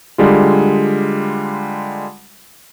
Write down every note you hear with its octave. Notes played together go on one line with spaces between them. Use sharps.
D3 G3 G#3 F4